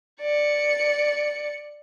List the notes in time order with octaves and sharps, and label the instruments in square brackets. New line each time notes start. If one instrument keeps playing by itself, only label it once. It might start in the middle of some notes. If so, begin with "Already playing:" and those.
[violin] D5 C#7